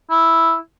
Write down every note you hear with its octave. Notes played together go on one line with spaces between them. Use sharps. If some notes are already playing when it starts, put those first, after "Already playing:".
E4